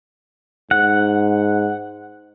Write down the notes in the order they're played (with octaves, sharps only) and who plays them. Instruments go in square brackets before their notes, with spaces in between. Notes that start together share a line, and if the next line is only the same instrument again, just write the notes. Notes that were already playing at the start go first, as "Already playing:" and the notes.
[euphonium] G#2 [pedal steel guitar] F#5